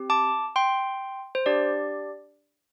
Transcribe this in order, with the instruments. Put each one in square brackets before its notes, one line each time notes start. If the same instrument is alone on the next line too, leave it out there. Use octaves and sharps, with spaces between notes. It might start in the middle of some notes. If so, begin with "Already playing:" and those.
Already playing: [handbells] C4 G4
A5 D6
G5 C6
C5
D4 G4 D5